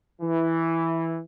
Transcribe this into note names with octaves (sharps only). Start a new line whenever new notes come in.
E3